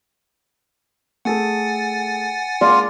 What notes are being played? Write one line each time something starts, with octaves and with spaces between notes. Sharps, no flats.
A3 G#4 A4 F#5 G#5 A6
G#3 A#3 F4 D5